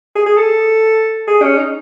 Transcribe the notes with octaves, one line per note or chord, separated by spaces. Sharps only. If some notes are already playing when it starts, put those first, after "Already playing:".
G#4
G#4
A4
G#4
C#4
D#4